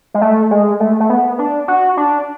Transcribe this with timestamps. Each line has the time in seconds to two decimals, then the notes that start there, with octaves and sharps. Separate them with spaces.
0.14 G#3
0.21 A3
0.51 G#3
0.80 A3
1.00 A3
1.10 B3
1.39 D4
1.68 F#4
1.97 D4